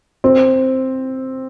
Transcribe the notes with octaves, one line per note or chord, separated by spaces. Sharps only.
C4